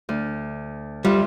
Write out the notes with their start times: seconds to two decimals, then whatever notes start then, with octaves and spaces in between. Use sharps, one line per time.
0.09 D2
1.05 F2 G3 F4 E5